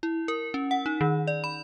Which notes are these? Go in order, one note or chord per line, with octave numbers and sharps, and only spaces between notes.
E4
A#4
C#4
F#5
D#4
D#3
D5
B5